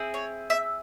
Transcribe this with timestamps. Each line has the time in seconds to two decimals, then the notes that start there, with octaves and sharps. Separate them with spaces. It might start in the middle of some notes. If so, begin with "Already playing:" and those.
Already playing: C4 E4 G#4
0.14 C#5
0.50 E5